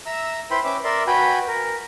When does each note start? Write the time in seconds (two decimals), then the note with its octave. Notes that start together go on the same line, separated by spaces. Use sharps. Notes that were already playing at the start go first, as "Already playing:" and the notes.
0.06 E5 A#5 E6
0.51 E4 B4 C5 G5 B5 C6
0.64 C#4 B4 E5 G5 D6 G6
0.84 A#4 D5 E5 C6
1.07 F#4 B4 G5 G#5 B5
1.48 A#4